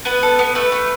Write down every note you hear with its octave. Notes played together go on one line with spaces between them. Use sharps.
B3 B4
A4
B3
A3 B4
A3